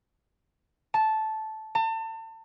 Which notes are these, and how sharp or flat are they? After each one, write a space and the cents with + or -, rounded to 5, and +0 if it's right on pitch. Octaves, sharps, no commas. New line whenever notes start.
A5 -10
A5 +35